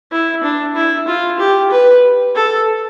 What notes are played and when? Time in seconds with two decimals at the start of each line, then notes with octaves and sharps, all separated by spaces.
0.12 E4
0.43 D4
0.75 E4
1.07 F4
1.39 G4
1.71 B4
2.35 A4